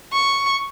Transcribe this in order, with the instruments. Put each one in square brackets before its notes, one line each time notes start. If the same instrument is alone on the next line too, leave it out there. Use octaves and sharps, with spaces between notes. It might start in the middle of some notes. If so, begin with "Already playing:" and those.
[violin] C#6